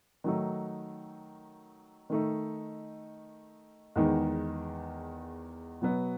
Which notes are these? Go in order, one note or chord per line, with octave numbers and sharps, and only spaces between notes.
D#3 F#3 A3 D#4
D#3 A3 D#4
E2 D#3 G#3 B3 D#4
B2 F#3 B3